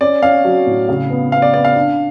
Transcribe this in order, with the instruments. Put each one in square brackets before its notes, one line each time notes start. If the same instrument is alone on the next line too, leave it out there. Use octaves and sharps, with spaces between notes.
[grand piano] C#4 [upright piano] D5
[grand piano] C#4 [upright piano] F5
[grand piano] F#3
A2
C#3
B3
[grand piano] B3 [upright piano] F5
[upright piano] D5
[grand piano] B3 [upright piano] D5
[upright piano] F5
[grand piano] D4